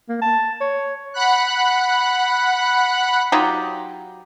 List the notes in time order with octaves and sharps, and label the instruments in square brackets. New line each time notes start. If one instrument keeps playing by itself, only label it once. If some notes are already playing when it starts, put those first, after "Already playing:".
[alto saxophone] A#3
A5
C#5
[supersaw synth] F#5 B5 F#6
[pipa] F#3 D#4 F4 G4